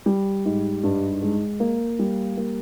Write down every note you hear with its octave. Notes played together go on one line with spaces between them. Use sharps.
G3
G#2
G2
G#3
A#3
G3
A#3